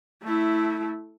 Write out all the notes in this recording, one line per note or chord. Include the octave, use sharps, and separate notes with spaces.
A3 E4